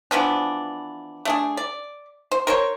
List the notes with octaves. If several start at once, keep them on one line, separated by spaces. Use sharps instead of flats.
E3 F3 B3 D4
A3 D4 G#4
D5
C5
A#4 C5 C#5